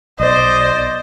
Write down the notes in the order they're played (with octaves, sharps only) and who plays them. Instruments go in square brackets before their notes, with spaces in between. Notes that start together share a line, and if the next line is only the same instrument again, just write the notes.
[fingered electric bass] B1 [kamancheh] C5 [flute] D5 [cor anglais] D#5